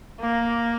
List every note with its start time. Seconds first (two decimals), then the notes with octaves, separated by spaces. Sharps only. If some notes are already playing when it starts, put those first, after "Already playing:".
0.20 A#3